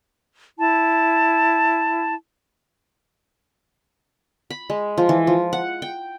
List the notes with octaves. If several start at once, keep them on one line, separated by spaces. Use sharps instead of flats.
E4 A5
B5
G#3
F3
E3
F3
F#5
G5